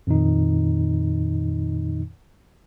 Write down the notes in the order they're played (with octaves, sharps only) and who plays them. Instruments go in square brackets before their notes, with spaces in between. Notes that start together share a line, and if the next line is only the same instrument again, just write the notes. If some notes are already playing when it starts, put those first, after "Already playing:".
[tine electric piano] F2 A#2 D#3 D#4